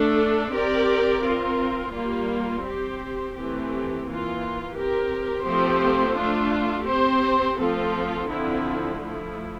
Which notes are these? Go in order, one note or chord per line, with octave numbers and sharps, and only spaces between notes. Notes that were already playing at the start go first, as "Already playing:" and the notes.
Already playing: A3 D4 A4
C4 G4 A#4 D5
C4 F4 A#4
G3 A#3 F4
C4 G4 C5
E3 A3 C4 G4
E3 A#3 F4
C4 G4 A#4
F3 A3 C4 G4 C5
A3 D4 F4
C4 G4 C5
F3 A3 C4 F4 A4
D3 F3 C4 E4
F3 A3 E4